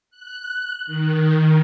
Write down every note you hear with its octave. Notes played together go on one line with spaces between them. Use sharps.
F#6
D#3